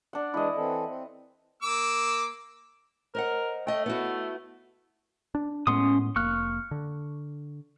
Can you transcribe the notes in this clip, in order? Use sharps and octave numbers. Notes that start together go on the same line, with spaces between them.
D4 F#5
E3 G#3 D4 E4 D#5
E3 C4 A4
C4
A#3 D6 E6
A#4 C5 D#5 F#5
A3 D#5 G5
B3 E4 F#4
D4
A2 G#3 B3 C#4 C6 D#6
F1 A#3 C#6 F6 F#6
D3